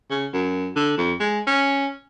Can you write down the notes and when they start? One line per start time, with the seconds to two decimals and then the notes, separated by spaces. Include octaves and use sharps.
0.11 C#3
0.33 F#2
0.76 D3
0.97 F2
1.20 G#3
1.47 C#4